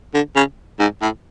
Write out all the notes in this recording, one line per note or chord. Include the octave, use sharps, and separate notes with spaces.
D3
C#3
G#2
A2